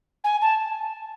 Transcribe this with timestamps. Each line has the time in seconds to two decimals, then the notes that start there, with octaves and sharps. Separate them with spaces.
0.24 G#5
0.42 A5